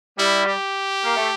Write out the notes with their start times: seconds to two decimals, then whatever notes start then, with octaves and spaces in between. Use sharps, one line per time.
0.18 G3 E4
0.46 G4
1.04 A#3
1.16 A3